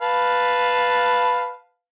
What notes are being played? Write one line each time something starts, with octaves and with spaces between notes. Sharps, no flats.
B4 F5 A5